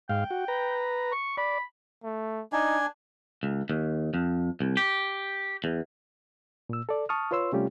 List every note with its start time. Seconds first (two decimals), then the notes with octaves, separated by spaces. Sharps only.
0.09 G#2 F5 G5
0.31 F#4
0.48 B4 A#5
1.12 C#6
1.37 D5 B5
2.04 A3
2.53 D4 D#4 G#5
3.43 C#2
3.70 D#2
4.14 F2
4.60 C2
4.77 G4
5.64 E2
6.69 A#2 E6
6.89 A4 D5
7.09 A5 C#6 D#6 F6
7.31 F4 B4 C#5 C6 E6
7.52 C3 G3 A3 C#4 F4 G4